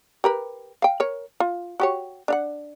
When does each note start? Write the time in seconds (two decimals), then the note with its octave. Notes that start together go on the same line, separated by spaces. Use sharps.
0.24 G4 A#4 B4
0.82 F5 G5
1.00 A#4 C#5
1.40 F4
1.80 F#4 G4 C#5
2.28 D4 F5 F#5